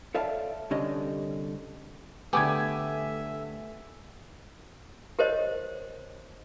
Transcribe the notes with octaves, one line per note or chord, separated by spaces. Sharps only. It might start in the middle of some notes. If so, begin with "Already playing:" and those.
A4 C#5 D5 E5 F5 A5
C2 D3 C#4 G4 D#5
D3 A3 B3 G4 E5 G#5 D6 G#6
G4 A#4 C5 C#5 D#5